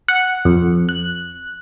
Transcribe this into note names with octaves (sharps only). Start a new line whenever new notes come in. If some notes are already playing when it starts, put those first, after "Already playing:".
F#5
F2
F#6